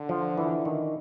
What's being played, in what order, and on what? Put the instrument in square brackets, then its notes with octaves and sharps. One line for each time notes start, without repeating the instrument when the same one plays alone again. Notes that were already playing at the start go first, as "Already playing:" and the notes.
Already playing: [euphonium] D3
[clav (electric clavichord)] F3
E3
D#3